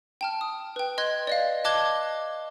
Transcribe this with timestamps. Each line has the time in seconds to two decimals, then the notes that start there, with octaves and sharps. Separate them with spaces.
0.21 G5 A5 F6
0.41 D#6
0.76 B4 G5
0.98 D#5 C6 F#6 G#6
1.27 D5 D#5 F5
1.64 D#5 A5 D6 F#6 G#6 G7